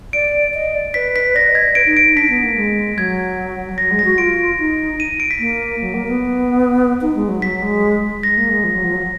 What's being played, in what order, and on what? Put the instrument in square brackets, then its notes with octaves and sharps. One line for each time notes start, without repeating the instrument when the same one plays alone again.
[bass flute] D5 [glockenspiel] D7
[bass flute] D#5
D5
[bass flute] B4 [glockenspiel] B6
[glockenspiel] B6
[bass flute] D5 [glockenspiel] A#6
[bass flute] D#5
[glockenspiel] G#6
[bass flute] D5
[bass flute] B4 [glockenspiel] D7
[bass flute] D#4
[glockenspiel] D7
[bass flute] D#4
[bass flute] D4 [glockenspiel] B6
[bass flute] B3
A#3
G#3
[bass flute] F#3 [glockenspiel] G#6
[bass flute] F#3 [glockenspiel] A#6
[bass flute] G#3
[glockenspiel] A#6
[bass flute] F#4
[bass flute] F4 [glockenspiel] D7
[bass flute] D#4
[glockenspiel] D#7
D7
B6
[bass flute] A#3
F#3
A#3
B3
D#4
G#3
F#3
[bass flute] F#3 [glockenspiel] B6
[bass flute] G#3
[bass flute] G#3 [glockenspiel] A#6
[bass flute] A#3
G#3
F3
F#3
F3
F#3